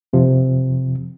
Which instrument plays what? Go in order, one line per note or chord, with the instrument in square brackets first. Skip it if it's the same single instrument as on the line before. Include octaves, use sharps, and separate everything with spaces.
[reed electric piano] F2 C3 F3